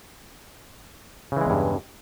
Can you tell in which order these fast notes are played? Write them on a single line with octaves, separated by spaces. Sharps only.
C#3 E3 G#3 E2 G2